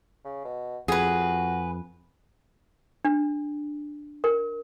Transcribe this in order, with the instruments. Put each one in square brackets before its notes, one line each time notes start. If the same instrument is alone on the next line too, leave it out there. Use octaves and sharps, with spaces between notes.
[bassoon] C#3
B2
[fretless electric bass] F2 [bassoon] F#4 [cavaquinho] G#4 B4
[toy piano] D4
A#4